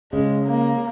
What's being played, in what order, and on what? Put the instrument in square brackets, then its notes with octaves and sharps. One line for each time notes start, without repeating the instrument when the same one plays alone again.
[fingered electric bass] C#3 [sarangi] G#3
[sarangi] A#3